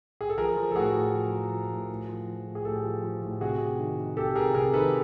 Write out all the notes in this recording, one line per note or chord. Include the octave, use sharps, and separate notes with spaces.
G#4
A4
F3 G#4 A#4
F3
A4
A2 F#4 G#4
A2
F3
F3
F3
A2
A2
F3
F3
A2
G#4
A2 G4 A4
F3
F3
A2
C3 F#4 G#4
C3
D#3
D#3
C3 G4 A4
C3 G#4 A#4
C3 G#4 A#4
D#3 A4 B4